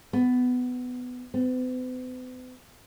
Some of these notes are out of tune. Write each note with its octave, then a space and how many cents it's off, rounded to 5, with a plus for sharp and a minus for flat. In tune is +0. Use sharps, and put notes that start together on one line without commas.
B3 +15
B3 +45